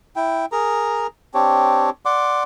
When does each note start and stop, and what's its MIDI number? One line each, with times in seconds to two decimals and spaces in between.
0.16 0.45 64
0.16 0.45 79
0.52 1.07 68
0.52 1.07 70
0.52 1.07 82
1.34 1.90 60
1.34 1.90 62
1.34 1.90 67
1.34 1.90 73
2.05 2.43 74
2.05 2.43 78
2.05 2.43 84
2.05 2.43 86